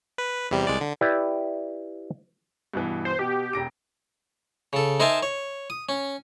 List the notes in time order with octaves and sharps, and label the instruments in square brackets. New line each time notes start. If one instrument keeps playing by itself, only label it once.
[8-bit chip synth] B4
E2 C3 G3
C2 G#3 D5
D3
[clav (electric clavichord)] E4 G4 B4 D5
[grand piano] G2 B2 E3
[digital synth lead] C5
[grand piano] B2 [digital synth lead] G4
[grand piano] E1 A#6 D7
[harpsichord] C#3 A4
D#4 A#4 C5 E5 G#5 A5
C#5
D#6
C#4